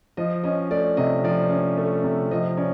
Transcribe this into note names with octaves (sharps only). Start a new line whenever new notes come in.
F3 D#5
C#4 D#5
A3 D5
C3 D#5
F3 D5
C#4
A3
C3
F3 D#5
C#4 D5